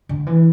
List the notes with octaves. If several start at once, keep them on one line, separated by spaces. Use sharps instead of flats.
D3
E3